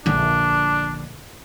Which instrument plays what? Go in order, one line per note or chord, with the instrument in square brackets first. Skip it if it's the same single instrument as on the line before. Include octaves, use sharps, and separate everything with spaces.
[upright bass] A#1 D3 [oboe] D4